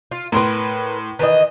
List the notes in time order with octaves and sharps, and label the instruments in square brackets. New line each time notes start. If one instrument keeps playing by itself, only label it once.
[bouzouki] F4
[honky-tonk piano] A2 C6 [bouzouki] A#4 B4
[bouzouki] D#3 E3 D#5 [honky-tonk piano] B4